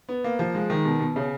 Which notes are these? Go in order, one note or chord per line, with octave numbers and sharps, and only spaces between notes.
B3
A#3
F3
G#3
D#3
B2
B2
C#3